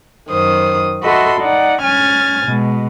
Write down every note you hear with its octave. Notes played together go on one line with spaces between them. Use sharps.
F#2 D#3 C5 D#6
F#4 A4 D#5 E5 B5 C6
D#4 D5 F#5
C#4 G#5 F6 G#6 A6
B2 G#3